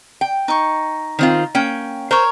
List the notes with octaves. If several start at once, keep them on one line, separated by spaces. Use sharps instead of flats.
G5
D#4 C#6
D#3 C4 F4
A#3 C#4 G5
A#4 C5 C#5